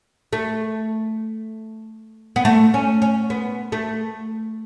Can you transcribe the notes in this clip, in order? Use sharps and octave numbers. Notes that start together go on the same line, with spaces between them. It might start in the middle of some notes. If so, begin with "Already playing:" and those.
A3
B3
A3
C#4
C#4
B3
A3